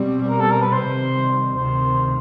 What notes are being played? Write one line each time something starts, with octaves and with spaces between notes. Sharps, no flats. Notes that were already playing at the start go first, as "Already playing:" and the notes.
Already playing: B2 G3 C4
A#4
A4
A#4
B4
C3 D#3 G3 C4 C5
D2 C3 D#3 C5